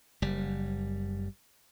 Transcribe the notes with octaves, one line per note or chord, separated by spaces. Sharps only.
F#1 G3